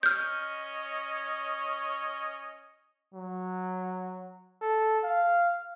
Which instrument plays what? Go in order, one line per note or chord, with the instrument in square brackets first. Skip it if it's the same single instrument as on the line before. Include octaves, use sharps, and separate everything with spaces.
[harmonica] C#4 C#5 D#5 [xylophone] F6 G6
[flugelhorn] F#3
A4
F5